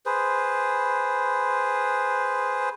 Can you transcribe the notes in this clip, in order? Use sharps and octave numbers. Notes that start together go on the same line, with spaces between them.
G#4 B4 C5